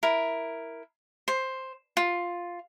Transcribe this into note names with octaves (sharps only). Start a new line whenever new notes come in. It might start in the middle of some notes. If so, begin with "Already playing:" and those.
E4 A#4
C5
F4